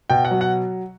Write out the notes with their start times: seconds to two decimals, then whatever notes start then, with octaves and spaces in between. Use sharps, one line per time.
0.10 B2 G5
0.25 F#5
0.31 F#3
0.41 F#5